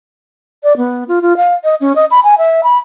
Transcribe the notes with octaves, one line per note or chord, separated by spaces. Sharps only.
D5
B3
F4
F4
F5
D#5
C#4
D#5
B5
G#5
E5
B5